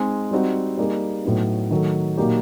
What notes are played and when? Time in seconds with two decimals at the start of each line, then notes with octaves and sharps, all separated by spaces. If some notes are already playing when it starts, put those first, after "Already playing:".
Already playing: G#3 C4 D#4 G#4
0.31 G3 C4 D#4 F#4
0.77 G3 A#3 D#4 G#4
1.24 A2 F#3 B3 D#4
1.71 D#3 F#3 A3
2.17 A#2 F#3 A#3 D#4 G4